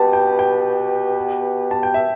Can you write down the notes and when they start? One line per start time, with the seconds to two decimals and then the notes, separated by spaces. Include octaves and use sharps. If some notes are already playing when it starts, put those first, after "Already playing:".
Already playing: B2 B3 G4 B4 A5
0.13 G5
0.39 G5
1.71 A5
1.83 G5
1.94 E5